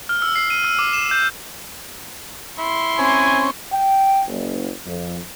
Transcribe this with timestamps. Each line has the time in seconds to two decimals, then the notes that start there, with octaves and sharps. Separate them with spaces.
0.09 F6
0.22 E6
0.36 C7
0.50 D#7
0.64 E6
0.79 D6
0.93 E7
1.11 G6
2.59 E4 C6 C#6
2.99 C4 C#4 G#5
3.72 G5
4.26 F#1
4.85 F2